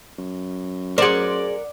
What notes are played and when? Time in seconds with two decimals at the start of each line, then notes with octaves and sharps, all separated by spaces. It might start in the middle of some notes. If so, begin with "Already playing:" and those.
0.18 F#2
0.98 G#4 A#4 C5 D5 F#5